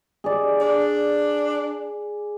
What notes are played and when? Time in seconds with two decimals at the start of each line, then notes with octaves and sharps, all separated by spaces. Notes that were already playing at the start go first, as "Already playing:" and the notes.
0.24 G#4 D5
0.61 D4